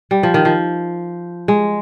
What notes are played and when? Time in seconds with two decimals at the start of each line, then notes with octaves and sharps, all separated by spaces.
0.11 G3
0.23 F3
0.34 D#3
0.45 F3
1.48 G#3